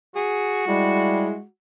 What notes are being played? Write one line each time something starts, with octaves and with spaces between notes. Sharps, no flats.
F#4 G#4
G3 G#3 E4